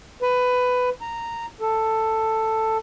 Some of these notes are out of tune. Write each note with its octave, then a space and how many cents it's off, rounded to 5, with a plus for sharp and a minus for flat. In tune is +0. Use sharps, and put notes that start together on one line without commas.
B4 +15
A#5 -10
A4 +10